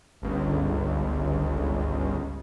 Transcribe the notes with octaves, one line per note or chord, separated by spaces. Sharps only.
G1 C#2